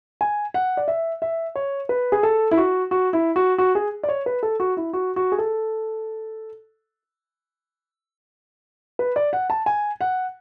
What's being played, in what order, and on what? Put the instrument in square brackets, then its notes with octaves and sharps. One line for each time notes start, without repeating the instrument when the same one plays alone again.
[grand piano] G#5
F#5
D5
E5
E5
C#5
B4
G#4
A4
E4
F#4
F#4
E4
F#4
F#4
G#4
D5
C#5
B4
A4
F#4
E4
F#4
F#4
G#4
A4
B4
D5
F#5
A5
G#5
F#5